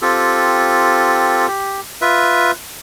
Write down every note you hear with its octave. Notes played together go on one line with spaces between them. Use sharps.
C4 F4 G4 A4
G4
F4 B4 E5